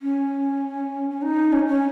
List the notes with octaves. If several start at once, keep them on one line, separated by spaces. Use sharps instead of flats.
C#4
C#4
D#4
C#4
C#4